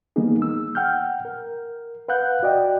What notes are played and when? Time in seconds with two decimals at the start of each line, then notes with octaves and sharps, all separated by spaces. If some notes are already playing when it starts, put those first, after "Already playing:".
0.16 D#3 G3 A#3 B3 D#4 G#4
0.42 E6
0.75 F#5 G5 F6 G6
1.25 A#4
2.08 B4 F5 F#5 F#6 G6
2.43 F#4 D5 D#5 G5